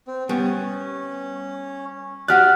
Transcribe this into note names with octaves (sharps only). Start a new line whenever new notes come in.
C4
G3 B3 C#4
F#4 G4 D5 F#5 F6 F#6